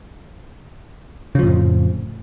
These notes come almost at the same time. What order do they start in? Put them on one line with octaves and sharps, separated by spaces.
C#3 F3 A2 F2